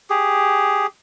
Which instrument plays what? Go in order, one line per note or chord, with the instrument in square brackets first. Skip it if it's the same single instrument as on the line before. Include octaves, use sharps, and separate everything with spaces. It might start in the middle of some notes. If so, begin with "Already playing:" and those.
[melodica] G4 G#4